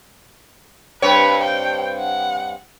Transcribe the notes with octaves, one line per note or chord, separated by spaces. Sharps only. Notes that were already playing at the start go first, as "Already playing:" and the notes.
G2 C4 B4 C#5
G5
F#5